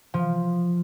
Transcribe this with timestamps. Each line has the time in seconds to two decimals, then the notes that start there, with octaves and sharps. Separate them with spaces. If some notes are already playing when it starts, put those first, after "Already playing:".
0.14 F3